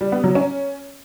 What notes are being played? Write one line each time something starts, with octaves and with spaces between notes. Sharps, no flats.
G3
B3
F#3
C#4